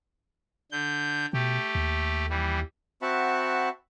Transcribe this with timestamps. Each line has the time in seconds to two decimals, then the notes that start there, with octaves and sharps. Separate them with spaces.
0.72 D3 G6
1.33 B2 A3 G4
1.75 D#2
2.30 E3 G3
3.02 C4 F#4 E5 F#5 A5 B5